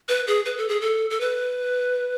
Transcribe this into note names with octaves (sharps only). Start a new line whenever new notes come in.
B4
G#4
B4
A4
G#4
A4
A4
B4